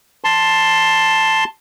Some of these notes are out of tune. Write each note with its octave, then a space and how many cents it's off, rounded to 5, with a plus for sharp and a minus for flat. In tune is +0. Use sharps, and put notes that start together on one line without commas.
A5 +5 C6 +5